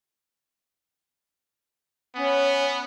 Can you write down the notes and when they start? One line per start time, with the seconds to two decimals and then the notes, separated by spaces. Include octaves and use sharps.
2.15 B3 C#4 G#5